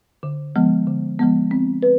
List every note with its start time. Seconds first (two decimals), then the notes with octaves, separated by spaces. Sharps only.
0.23 D3
0.56 F3 G#3 B3
0.87 D3
1.19 F3 G#3 B3
1.51 C4
1.83 B4